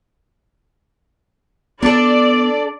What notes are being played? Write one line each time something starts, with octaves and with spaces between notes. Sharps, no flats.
B3 D4 A4 D5